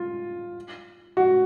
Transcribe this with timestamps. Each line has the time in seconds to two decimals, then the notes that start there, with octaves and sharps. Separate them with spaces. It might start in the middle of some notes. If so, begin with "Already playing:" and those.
Already playing: F4
1.17 F#4